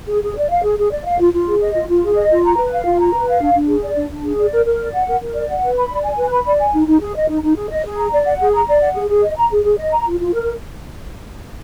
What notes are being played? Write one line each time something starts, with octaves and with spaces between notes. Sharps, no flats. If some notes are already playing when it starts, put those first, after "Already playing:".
G#4
G#4
D5
F5
G#4
G#4
D5
F5
F4
F4
G#4
D#5
F4
F4
G#4
D#5
F4
A#5
B4
F5
F4
A#5
B4
F5
D4
D4
G#4
D5
D4
D4
G#4
D5
A#4
A#4
D5
F#5
A#4
A#4
D5
F#5
B4
B5
D5
G#5
B4
B5
D5
G#5
D#4
D#4
G#4
D#5
D#4
D#4
G#4
D#5
G#4
A#5
D5
F#5
G#4
A#5
D5
F#5
G#4
G#4
D#5
A#5
G#4
G#4
D#5
A#5
F4
F4
A#4